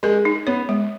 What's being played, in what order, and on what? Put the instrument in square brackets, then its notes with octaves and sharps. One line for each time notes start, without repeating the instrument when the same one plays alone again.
[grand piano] G#3 [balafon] A#4
[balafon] D#4
[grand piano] B3 [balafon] C#5
[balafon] G#3